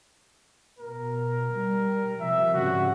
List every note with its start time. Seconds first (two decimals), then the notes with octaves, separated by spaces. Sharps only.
0.79 B2 A#4
1.53 G3
2.21 C3 F3 E5
2.53 G#2 C#3 G3 F#4